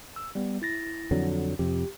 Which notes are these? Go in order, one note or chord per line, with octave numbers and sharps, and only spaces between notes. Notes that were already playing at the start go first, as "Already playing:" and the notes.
E6
G3 B3
E4 A6 A#6
F2 D3 F#3
F2 C3 G4